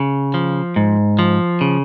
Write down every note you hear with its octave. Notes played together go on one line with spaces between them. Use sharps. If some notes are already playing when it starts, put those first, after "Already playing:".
Already playing: C#3
F3
G#2
F3
C#3